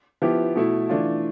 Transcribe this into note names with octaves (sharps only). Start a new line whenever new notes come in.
F3 B3 E4 G4
B2 A3 E4
E3 A3 D4 F4